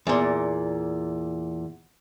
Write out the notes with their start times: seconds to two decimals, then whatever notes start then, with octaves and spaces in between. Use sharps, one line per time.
0.07 E2 A#2